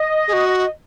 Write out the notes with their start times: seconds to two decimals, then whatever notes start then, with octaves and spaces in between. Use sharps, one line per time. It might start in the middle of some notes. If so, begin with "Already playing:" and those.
Already playing: D#5
0.28 G#4
0.33 F#4